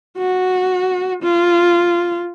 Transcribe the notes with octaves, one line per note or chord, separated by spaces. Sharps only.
F#4
F4